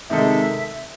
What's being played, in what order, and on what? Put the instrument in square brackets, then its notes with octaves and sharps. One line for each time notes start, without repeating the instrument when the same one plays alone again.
[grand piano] C3 D#3 G#3 D#4 A4 [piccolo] E5